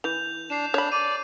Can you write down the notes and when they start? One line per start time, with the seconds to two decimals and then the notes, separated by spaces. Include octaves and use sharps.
0.04 E3 G6 F7
0.50 D4 C7 E7
0.74 D4 C#5 B5
0.92 D5 D#7